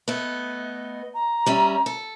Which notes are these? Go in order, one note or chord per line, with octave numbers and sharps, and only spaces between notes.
A3 B3 D#5
A#5
G3 C#4 E5
A4